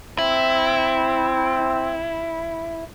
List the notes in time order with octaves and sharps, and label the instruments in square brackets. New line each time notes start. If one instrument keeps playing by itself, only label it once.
[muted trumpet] C4 [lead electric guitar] E4